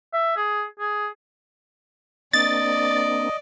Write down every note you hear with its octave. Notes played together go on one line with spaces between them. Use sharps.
E5
G#4
G#4
A#3 C4 D4 D5 D#5 A6